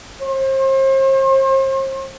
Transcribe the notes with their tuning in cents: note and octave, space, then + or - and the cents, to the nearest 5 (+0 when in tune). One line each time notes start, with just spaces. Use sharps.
C5 +40